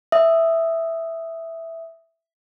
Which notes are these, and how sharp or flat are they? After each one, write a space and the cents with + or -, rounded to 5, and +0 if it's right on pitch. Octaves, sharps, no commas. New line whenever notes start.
E5 +0 D#6 +0